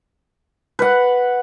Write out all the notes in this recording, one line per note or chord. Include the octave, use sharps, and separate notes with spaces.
B4 F#5